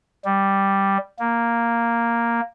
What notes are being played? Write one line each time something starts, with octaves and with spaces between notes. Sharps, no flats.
G3
A#3